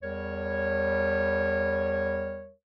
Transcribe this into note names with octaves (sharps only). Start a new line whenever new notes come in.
E2 G3 A#4 C#5